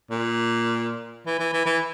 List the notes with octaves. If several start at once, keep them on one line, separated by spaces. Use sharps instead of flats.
A#2
E3
E3
E3
E3